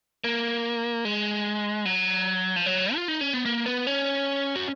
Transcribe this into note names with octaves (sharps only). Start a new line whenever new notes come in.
A#3
G#3
F#3
F3
F#3
F4
D#4
C#4
B3
A#3
B3
C#4
F#4